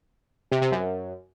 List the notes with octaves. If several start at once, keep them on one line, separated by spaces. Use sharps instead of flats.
C3
C3
F#2